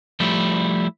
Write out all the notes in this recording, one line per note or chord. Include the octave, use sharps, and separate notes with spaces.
F3 G3 A3 E4